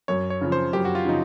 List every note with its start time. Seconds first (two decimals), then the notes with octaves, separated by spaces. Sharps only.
0.08 F#2 C#5
0.30 C#5
0.41 C#3 F3
0.52 C5
0.73 F#2 G4
0.85 F#4
0.95 F4
1.05 C#3 F3 D#4